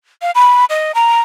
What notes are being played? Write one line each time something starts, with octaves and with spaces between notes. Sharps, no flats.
F5
B5
D#5
A#5